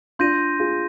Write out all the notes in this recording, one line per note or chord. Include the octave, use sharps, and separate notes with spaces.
D4 F4 C6 G6 A#6 D#7
F4 G#4